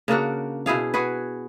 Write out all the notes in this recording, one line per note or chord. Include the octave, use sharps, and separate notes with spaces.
C#3 A#3 D4 F#4
B2 E4 G#4 F5
F#4 G#4 B4